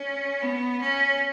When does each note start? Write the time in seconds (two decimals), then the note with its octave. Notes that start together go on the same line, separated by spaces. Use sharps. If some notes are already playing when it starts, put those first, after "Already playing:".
Already playing: C#4
0.42 B3
0.81 C#4